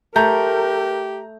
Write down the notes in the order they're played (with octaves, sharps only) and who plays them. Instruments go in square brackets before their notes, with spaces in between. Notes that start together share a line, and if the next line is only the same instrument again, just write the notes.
[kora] A3 [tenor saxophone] G4 [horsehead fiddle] A#4 [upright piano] A#5 G6